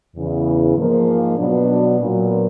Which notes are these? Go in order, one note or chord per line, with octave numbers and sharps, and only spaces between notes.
E2 C#3 E3
G#2 F3 A#3
B2 F#3 B3 D4
A#2 F#3 B3